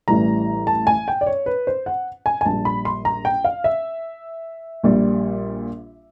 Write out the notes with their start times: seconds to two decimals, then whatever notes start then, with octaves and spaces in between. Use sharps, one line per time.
0.08 A1 A2 E3 G3 A#5
0.67 A5
0.87 G#5
1.08 G5
1.21 D5
1.26 C#5
1.46 B4
1.67 C5
1.86 F#5
2.26 G#5
2.41 G#5
2.45 A#1 A#2 G3 A5
2.65 B5
2.85 C6
3.05 A#5
3.25 G5
3.45 F5
3.64 E5
4.83 A#1 A#2 G3